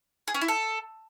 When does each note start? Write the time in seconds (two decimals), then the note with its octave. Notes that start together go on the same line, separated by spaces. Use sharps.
0.28 G#4
0.34 C#4
0.41 E4
0.48 A4